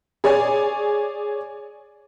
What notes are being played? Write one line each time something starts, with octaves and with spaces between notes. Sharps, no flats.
G#4 C#5 D5 G#5